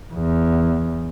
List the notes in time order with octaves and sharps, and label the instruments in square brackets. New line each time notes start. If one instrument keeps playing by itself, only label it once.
[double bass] E2